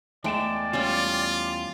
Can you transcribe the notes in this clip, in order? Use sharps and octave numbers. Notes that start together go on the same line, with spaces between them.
E2 G#3 A3 D5 G5 A5
G3 C#4 F4 A4